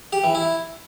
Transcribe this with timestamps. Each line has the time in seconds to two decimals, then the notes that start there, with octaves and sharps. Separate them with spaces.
0.13 G4
0.24 E3
0.35 E4